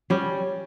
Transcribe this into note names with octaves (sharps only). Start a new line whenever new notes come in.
G3 C#4